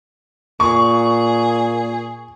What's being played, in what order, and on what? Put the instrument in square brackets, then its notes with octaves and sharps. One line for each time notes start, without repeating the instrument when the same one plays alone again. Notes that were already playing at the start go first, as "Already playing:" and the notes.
[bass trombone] A#2 [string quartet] G#4 [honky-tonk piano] C#6